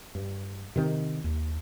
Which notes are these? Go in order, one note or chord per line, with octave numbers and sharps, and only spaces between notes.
G2
C3 D#3 C4
D#2